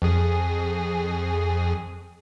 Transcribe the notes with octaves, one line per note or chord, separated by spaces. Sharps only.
F2 G#4